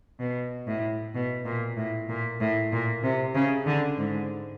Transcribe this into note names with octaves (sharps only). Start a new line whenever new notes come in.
B2
A2
B2
A#2
A2
A#2
A2
A#2
C3
C#3
D3
G#2